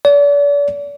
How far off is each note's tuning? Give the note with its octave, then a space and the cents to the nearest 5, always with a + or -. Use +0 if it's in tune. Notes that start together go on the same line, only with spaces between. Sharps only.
D5 -40